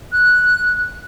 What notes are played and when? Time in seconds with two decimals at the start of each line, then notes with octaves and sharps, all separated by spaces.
0.12 F#6